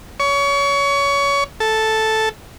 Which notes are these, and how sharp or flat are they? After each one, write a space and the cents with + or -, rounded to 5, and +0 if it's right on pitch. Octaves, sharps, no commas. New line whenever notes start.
C#5 +25
A4 +0